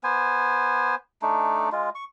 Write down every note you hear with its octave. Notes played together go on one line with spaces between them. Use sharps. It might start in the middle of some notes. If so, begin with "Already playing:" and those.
B3 C5 G#5
A3 D4 D#4
G#3 F4
C#6